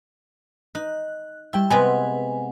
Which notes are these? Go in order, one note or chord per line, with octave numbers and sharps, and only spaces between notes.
D#4 F#6
G3 E4 G5 E6
C3 G#3 B3 B4 F#5 G#5